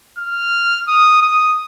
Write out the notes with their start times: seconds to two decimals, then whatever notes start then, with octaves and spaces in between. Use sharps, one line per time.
0.19 F6
0.88 D#6
1.22 D#6